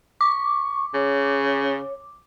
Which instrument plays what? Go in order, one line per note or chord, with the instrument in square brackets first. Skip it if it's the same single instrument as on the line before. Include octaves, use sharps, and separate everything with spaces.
[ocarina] C#6 [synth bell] D6
[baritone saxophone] C#3 [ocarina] C#5